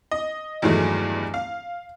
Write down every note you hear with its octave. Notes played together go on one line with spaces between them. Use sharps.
D#5
E2 G2 D#3 F#3 G#3 A3
F5